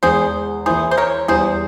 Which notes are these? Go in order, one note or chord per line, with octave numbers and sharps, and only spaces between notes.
E2 E3 G#3 G#4 C5
E3 A#3 E4 G#4 C5
C5
A#4 C#5
E2 E3 G3 G#4 C5